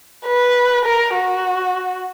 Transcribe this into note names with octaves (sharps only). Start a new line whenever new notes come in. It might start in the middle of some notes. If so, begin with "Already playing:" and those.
B4
A#4
F#4